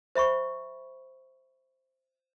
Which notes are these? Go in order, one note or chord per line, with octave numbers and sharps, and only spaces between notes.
C5 E5 B5 C#6